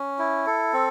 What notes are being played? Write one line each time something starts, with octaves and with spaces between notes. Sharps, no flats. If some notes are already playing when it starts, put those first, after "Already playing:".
Already playing: C#4
E4
A4
C4